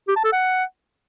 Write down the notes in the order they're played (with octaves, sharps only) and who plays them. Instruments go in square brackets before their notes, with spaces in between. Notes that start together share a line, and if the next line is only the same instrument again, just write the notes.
[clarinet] G4
A5
A4
F#5